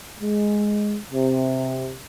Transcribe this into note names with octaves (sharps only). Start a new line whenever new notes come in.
G#3
C3